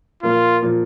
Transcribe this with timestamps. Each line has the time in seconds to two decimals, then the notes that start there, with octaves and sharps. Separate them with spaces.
0.22 A#2 F3 A#3 F4
0.62 A#2 F3 A#3